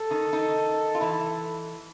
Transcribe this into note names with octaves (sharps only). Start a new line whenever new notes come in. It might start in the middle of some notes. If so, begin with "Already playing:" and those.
Already playing: A4
D#3 D#4
D#3 D#4
F4
E3 E4